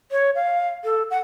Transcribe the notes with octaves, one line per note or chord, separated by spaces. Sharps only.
C#5
F5
A4
F#5